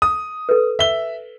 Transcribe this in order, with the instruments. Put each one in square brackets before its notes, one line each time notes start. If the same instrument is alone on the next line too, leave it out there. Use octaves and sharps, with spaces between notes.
[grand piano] D#6
[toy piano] A4 B4
[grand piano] E5 G7